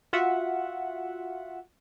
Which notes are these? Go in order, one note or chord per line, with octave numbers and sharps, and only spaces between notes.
F4 F#4 E5 F#5